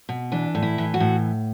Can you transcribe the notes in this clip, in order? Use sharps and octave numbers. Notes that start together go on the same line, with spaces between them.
B2
E3 D4
A2
E4
E3
F#4
A2